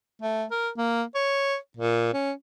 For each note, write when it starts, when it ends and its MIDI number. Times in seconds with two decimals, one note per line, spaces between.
0.22 0.44 57
0.51 0.69 70
0.77 1.03 58
1.15 1.56 73
1.77 2.10 46
2.14 2.32 61